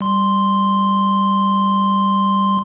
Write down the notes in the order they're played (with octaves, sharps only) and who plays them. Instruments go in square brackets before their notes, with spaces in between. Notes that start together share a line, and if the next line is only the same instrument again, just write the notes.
[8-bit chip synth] G3 C6